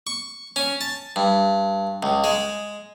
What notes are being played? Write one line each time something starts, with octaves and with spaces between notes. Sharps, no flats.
C#6
C#4
A5
G2
C#2
G#3